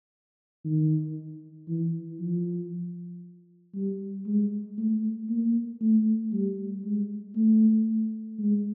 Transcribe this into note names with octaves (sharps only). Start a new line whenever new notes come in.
D#3
E3
F3
G3
G#3
A3
A#3
A3
G3
G#3
A3
G#3